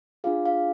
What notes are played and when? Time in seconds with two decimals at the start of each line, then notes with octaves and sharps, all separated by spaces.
0.24 D4 F4 G#4 F5
0.46 F5